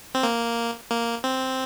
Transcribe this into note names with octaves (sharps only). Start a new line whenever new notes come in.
C4
A#3
A#3
C4